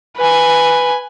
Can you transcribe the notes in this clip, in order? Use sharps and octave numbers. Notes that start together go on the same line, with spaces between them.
B4 G#5